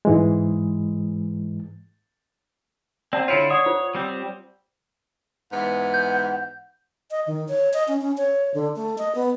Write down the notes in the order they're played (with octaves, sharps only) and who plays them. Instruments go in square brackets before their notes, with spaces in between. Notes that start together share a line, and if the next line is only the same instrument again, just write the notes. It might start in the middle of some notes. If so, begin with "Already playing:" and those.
[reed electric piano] G#2 E3 G#3
[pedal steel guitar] C4 [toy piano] D5 F#5 A5
[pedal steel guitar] D3 E4 F4 [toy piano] C#5
[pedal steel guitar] C#5 [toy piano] D5 F#5 D#6
[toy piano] F4 C5
[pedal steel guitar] G3 C4
[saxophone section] G#2 E3 B3 [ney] F#5
[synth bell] G6
[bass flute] D#5
D#3
C#5
D#5
C#4
C#4
C#5
D3
A3
D#5
B3